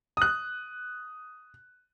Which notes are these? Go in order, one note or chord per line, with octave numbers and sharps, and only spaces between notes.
D#6 F#6